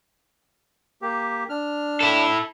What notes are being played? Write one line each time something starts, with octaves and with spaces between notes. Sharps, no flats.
A#3 G4
D4 F6
E4 A4